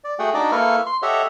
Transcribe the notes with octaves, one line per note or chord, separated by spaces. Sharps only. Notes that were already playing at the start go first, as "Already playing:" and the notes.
D5
A3 F#4 G#4 F#5 G5
D4 D#4 F#4 D5 D#5 D6
A#3 E4 A4 B4 C#6 F6
C6
G4 A4 C#5 D#5 E5 F#5